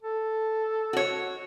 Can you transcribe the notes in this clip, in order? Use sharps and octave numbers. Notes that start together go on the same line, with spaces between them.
A4
F#4 C#5